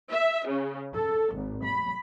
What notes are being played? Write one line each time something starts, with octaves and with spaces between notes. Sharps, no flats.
E5
C#3
A4
G#1
B5